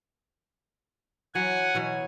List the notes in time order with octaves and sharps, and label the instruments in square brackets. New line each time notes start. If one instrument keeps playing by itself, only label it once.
[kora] E3 F#3 [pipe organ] F#5 G#5
[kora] B2 E3 F#3